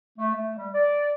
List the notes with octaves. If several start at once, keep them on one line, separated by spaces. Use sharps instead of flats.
A3
A3
G3
D5